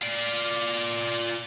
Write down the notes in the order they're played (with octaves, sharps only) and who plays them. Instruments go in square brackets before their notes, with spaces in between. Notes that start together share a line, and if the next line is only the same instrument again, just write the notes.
[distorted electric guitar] F4 D5